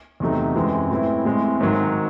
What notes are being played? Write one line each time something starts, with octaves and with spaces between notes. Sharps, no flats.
E2 C3 F#3 A3 D#4
F#2 E3 G#3 C4
A2 E3 C4 E4
A2 G#3 C4
G#2 D#3 F#3